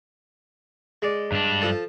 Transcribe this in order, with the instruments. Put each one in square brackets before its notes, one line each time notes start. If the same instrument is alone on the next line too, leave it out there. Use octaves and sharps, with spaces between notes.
[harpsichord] G#3 D5
[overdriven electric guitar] G2 D4
[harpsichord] F3 A4 A5